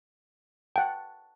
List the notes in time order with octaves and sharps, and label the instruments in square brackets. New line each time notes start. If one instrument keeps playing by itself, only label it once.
[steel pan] F#5 A5 [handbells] G5